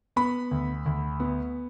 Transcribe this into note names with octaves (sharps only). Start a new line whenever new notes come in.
B3 B5
D2
D2
B3